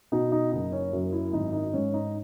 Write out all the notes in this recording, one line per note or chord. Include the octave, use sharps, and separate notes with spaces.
B2 D#4
D#4
F#1 D#4
C#4
F#2
E4
G#1 D#4
D#4
G#2 C#4
D#4